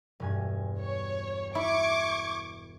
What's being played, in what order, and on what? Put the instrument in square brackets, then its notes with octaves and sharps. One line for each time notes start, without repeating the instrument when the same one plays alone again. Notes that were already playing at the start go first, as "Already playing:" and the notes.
[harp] E1 G2 G#5
[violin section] C#5
[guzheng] E4 [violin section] C#6 D6 G#6